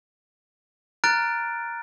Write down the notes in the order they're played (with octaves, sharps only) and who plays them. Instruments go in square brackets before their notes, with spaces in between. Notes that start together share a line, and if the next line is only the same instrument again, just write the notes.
[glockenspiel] A#5 F6 F#6 A6 D7